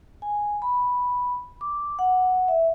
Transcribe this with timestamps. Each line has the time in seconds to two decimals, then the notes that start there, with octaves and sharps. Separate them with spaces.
0.22 G#5
0.62 B5
1.61 D6
1.99 F#5
2.48 E5